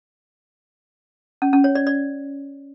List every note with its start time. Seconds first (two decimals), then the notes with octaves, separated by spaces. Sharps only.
1.42 C#4
1.53 C#4
1.64 C#5
1.75 D5
1.87 D5